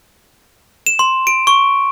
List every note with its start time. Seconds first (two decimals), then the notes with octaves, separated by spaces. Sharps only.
0.87 E7
0.99 C6
1.27 D7
1.47 C#6